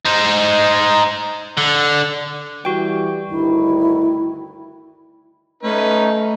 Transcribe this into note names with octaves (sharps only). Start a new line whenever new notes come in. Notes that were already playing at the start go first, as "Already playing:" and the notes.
D#4 C5
D3
E3 G3 F#4 G5
D2 G2 D#3 E4
A3 C#4 D#4 B4